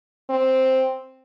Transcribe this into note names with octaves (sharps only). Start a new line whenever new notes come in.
C4